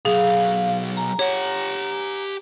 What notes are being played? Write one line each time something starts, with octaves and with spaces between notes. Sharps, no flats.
B1 F#3 G#4 F5
G#5 A#5
G4 C#5 F#5